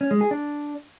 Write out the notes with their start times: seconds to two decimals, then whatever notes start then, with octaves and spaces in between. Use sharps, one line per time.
0.01 C#4
0.11 G#3
0.21 G#4
0.31 D4